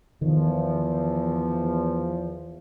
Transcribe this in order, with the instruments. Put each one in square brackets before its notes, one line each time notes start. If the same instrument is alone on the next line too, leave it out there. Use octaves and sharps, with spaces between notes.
[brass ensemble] E2 F3 [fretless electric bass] D#3